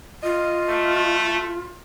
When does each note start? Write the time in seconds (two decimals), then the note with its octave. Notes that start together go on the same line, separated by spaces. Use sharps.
0.23 F4 D#5
0.69 A3